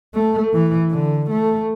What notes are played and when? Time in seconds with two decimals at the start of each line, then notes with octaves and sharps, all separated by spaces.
0.14 A3
0.53 E3
0.91 D3
1.30 A3